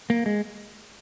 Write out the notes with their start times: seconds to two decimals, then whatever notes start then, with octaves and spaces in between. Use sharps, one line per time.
0.10 A#3
0.26 G#3